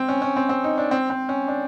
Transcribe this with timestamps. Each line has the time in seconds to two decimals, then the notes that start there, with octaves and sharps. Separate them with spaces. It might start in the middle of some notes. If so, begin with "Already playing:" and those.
Already playing: C4
0.09 C#4
0.22 C#4
0.36 C4
0.49 C4
0.64 D#4
0.78 D4
0.91 C4
1.10 C4
1.29 C#4
1.48 D4